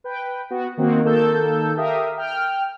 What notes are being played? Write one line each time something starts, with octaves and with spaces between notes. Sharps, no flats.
B4 G5
B3 F#4
D#3 A#3 C4 F#4
D#3 A#3 A4 A5 E6 G6
G4 A#4 E5 F5 D#6
G5 F6